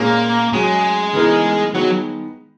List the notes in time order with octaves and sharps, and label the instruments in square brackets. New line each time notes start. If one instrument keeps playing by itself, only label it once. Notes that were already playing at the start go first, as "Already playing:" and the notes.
Already playing: [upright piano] A#2 G#3 C#4 [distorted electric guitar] A#3
[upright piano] F#3 C#4 G#4 [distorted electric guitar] G#3
[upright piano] C#3 E3 B3 D#4 A#4
[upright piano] D#3 G#3 B3 [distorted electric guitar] F#3